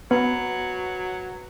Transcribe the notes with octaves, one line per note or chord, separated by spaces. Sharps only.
F#3 B3 B4